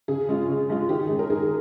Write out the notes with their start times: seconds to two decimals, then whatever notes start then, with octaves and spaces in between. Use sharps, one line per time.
0.08 C#3 G#4
0.29 G#3 C#4 F4
0.49 C#3
0.70 G#3 C#4 F4
0.89 D#3 G4
1.00 G#4
1.09 G#3 C#4
1.19 A#4
1.29 D#3 G#4